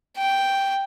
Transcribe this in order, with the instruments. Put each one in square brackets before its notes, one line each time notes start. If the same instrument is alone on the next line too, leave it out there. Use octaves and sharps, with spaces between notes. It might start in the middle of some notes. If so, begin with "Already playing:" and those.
[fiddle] G5